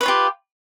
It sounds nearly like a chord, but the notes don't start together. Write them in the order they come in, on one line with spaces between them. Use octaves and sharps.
B4 C#5 F4 G4